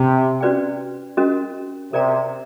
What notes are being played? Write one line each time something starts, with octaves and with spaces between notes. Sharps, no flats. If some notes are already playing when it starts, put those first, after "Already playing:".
Already playing: C3
C#4 F#4 B4 D5 G5
C#4 F#4 A#4 D#5
C3 A#4 D5 G5 A#5